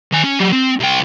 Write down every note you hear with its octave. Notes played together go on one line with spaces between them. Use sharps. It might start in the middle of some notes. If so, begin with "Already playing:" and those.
D#3 G#5
C#4
F#3 G4
C4
C2 G5